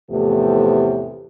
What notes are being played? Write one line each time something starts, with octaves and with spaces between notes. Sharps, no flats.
E2 A2 C3 F3 A3 G4